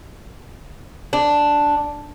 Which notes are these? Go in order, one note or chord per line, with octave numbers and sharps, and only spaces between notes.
D4